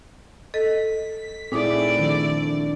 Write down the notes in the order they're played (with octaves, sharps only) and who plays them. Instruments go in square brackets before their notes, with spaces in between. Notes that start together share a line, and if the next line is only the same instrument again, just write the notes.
[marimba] A4 D#5 [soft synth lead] B6
[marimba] A#2 D#4 D6 [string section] A3 D5 [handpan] C4 E4 [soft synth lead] G#4
[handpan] D#3 F3 [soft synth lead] D4